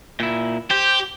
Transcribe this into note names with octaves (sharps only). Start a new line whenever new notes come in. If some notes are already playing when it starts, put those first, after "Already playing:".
A#2 E4
G4 C5